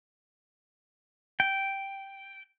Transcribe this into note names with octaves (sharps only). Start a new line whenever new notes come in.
G5